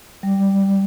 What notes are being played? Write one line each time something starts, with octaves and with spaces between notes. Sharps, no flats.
G3